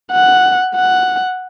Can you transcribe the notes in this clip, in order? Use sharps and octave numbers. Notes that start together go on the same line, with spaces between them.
F#5
F#5